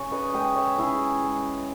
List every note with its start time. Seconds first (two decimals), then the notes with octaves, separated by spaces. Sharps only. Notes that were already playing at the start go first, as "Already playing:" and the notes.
Already playing: C#3 C#5
0.12 B4 D#5
0.33 G#3 D#5 G5
0.56 C#5 E5
0.77 C#3 E4 G#4
1.22 G#3